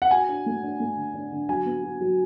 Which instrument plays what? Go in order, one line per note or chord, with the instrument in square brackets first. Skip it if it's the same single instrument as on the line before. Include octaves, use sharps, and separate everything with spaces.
[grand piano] F#5
[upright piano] F#4 [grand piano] G#5
[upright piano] D4
A3
D4
A3
D3
D4
D3
[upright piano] F#3 [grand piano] G#5
[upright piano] B3
F#4
F#3